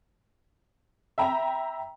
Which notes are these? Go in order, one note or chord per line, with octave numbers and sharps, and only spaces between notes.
E5 G5 A#5 B5